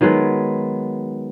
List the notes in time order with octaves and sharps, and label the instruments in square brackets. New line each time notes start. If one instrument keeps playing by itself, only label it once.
[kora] D#3 F#3 G#3 B3